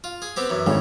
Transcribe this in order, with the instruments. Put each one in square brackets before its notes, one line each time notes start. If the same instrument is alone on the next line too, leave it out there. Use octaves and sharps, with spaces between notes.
[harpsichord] F4
G#4
B3 C4 G4
F#2 E3
[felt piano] G#1 [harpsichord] A2 C#3